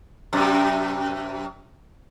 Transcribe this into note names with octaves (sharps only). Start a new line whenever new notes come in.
F#2 C3